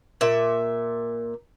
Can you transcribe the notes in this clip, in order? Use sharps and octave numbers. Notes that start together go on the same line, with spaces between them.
A#2 E5